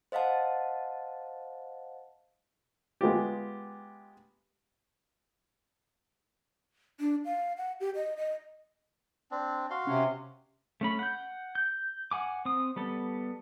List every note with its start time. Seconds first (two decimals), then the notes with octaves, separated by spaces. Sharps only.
0.12 C5 D#5 F5 F#5 A5
3.01 G#3 B3 F4 G4
7.00 D4
7.25 F5
7.57 F#5
7.80 G4
7.95 D#5
8.17 D#5
9.31 C4 D4
9.70 F#4 F5 C6
9.87 C3 C#4
10.81 A3 C#4 B5
10.99 F#5 G6
11.55 G6
12.11 F#5 G#5 D6
12.45 C4 D#6
12.76 G3 B3 A4